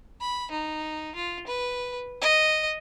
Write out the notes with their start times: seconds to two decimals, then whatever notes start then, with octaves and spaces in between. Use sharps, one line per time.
0.20 B5
0.51 D#4
1.15 F4
1.47 B4
2.22 D#5